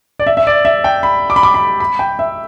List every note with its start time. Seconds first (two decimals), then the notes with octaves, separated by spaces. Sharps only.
0.19 D5
0.27 E5
0.37 E5
0.47 D5
0.65 E5
0.84 G5
1.03 B5
1.30 D6
1.36 B5
1.43 D6
1.54 B5
1.80 B5
1.99 G5
2.19 E5